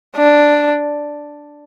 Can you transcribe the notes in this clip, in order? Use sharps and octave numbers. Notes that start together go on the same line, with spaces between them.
D4